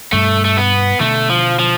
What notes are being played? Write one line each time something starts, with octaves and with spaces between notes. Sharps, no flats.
G2 B2 A3
A3
B3
B2 D3 A3
F3
F3